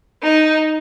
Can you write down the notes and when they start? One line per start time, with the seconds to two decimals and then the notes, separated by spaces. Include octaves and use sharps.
0.22 D#4